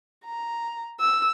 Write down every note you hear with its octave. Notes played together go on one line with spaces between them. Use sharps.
A#5
E6